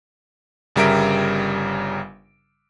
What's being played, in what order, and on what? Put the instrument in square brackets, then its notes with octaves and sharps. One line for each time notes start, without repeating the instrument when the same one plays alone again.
[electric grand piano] G1 C#3 G3 A#4 E5 D7